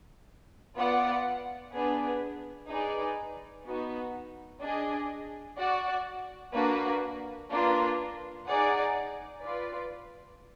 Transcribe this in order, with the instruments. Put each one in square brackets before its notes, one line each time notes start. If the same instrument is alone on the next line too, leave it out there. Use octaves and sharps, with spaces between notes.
[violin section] B3 F4 B4 D5 F#5
B3 D4 G#4 B4
D#4 G#4 B4 D5
B3 D#4 F#4
D4 G#4 D#5 G#5
F#4 D5 F#5
A#3 D4 F#4 B4
A#3 D4 F4 B4
D#4 G#4 D5 F#5
F4 B4 D5